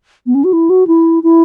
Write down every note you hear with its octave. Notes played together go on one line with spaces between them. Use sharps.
B3
C#4
F#4
E4
F#4
E4
E4